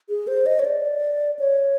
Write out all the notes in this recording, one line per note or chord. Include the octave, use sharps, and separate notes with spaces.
G#4
C5
D#5
C#5
D5
C#5